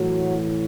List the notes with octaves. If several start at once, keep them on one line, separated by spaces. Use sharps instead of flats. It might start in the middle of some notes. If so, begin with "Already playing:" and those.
Already playing: A2 E3 F#3 F#4